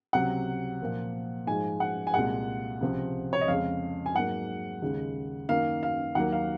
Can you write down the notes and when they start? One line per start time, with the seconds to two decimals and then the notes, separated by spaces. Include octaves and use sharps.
0.13 C#2 C3 F#3 F#5
0.81 A#2 F3 A#3
1.47 G#2 F3 G#3 G#5
1.80 F#5
2.07 G#5
2.14 C2 A#2 G#3 F#5
2.81 C#2 C3 F3
3.33 C#5
3.41 D#5
3.48 F2 C#3 G#3 F5
4.06 G#5
4.15 G#2 F#3 A#3 F#5
4.82 D#2 C#3 G#3
5.49 F#2 D#3 A#3 F5
5.83 F5
6.15 D#2 D#3 F#3 A#3 F#5
6.32 F5